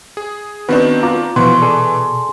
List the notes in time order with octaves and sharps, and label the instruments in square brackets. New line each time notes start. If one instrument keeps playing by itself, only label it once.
[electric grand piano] G#4
[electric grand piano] D#3 C4 D4 [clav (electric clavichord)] B3 F#4 [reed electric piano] B4 D#5
[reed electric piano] F4 A#5 D6
[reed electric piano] B2 C#6 [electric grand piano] E3 [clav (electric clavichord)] F3 B3 [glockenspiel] C6
[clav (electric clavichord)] G#4 A4 D5